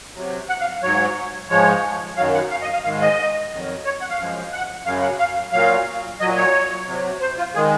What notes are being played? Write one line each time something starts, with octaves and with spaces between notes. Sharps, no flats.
C3 F#3
F#5
F5
G#2 F#3 C#5
G#2 F3 G#3 C#5
F#2 D#3 F#3 F5
F#5
F5
D#5
F5
G#2 D#3 G#3 F5
D#5
F2 D#3 F#3
C#5
F#5
F5
F#2 F3 G#3
F#5
F#2 C#3 F#3 F5
F#5
F5
A#2 F#3 F5
A#2 F#3 D#5
C#5
C3 F#3
C5
F4
D#3 G#3 G#4